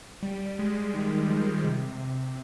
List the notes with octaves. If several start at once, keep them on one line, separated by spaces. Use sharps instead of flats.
G3
G#3
G3
D#3
F3
C3